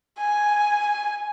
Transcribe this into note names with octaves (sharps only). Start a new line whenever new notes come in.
G#5